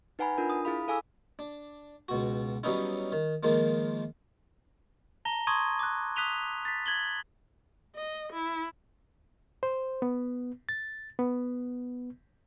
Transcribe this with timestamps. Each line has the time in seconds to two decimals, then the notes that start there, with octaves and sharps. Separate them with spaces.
0.19 D#4 B4 F#5 G#5 A#5 B5
0.38 D4 F4 A#4
0.50 D#6
0.65 E4 G#4 F5 B5
0.88 A4 F5 G#5 D6 E6
1.39 D4
2.08 C#2 B2 F#4
2.63 F#3 G3 B3 C#4 D#4 E4
3.12 D#3
3.43 D#3 F3 G#3 A#3
5.25 A5 A#5 A#6 G7
5.47 A5 C6 C#6 D#6 G#6 D#7
5.79 D6 F#6
6.16 D#6 F#6 B6 D#7 F7 G7
6.65 A6 B6
6.86 G#6 F#7 G7
7.96 D#5
8.33 E4
9.63 C5
10.02 B3
10.69 A6
11.19 B3